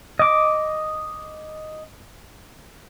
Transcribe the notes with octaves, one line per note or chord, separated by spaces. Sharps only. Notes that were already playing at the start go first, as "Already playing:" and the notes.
D#5 D6